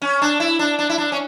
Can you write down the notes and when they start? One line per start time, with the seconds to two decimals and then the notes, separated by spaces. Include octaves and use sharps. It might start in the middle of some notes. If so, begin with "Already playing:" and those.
0.02 C#4
0.22 D4
0.40 E4
0.59 D4
0.79 D4
0.89 E4
0.98 D4
1.12 C#4